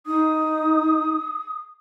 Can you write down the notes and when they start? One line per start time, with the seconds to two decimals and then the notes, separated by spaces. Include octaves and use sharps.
0.06 D#4 D#6